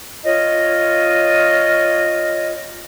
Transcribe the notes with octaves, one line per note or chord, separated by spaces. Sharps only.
F4 C#5 D#5